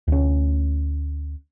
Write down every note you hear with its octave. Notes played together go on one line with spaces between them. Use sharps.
D2 C#4